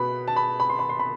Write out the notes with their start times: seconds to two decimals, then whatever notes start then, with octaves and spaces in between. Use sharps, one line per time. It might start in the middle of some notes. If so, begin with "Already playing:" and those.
Already playing: B2 B3 B5
0.28 A5
0.36 B5
0.60 B5
0.70 C6
0.79 B5
0.89 C6
0.99 B5